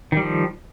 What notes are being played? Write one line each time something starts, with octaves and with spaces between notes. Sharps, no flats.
D#3 F3 G3